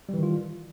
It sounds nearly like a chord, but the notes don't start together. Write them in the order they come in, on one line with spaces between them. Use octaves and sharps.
G3 E3 D#3 F4